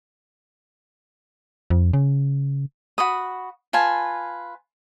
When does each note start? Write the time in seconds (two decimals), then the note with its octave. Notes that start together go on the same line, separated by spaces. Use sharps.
1.70 F2
1.93 C#3
2.98 F#4 B5 D#6
3.73 F4 B4 G#5 A5